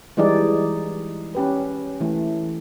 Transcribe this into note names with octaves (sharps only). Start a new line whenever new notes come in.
E3 G3 G#3 D#4 G#4 D5
C#4 G4 B4
E3 A3